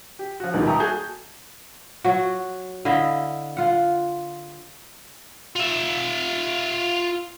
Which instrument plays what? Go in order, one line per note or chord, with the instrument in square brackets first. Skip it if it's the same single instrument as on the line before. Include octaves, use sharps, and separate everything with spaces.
[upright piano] G4
F3 F#4
D#1 G#1 B2 D#3
E5 G5 A5 A#5 C#6 D#6
F#4 G#4 A4 G6 G7
[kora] F#3 F#4
D3 E4 D#5 F5
F4 F#5
[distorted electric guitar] F4 E5